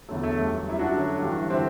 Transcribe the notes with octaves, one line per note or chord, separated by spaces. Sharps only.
E2 D3 F#3 A3
A3
G2 F#3
F#2 F#3 E4
D4 F#4
G2 D3 F#3
G2 E3
D3 C4 E4